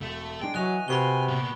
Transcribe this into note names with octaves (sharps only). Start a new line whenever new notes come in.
E1 A3
G#3 D4 G#4 G5
E3 F#3 F#4 D#5 G#5 F#6 F7
C3 F#4 G#4 B4 B5 C#6 G7
A#2 B3